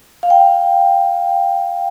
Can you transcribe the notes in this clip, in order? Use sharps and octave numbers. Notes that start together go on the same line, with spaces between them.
F5
G5